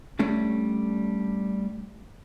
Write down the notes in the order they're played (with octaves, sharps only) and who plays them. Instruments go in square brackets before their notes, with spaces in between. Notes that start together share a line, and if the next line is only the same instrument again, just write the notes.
[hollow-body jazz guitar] G3 A3 C#4 D4